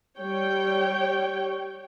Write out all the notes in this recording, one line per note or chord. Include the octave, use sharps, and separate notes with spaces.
G3 C#5 G5